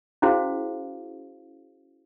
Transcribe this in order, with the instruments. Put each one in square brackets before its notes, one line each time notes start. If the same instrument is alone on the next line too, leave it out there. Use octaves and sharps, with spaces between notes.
[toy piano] C#4 E4 F#4 G#4 C5 F5